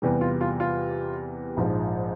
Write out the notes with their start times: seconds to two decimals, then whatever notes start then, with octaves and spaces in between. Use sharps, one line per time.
0.02 E2 C3 E3 G3
0.21 F4
0.41 F4
0.60 F4
1.57 A#1 G#2 F3 G#3